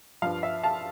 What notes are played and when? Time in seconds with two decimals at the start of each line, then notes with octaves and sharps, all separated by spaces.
0.22 G2 F3 F5
0.43 E5
0.63 F5 A5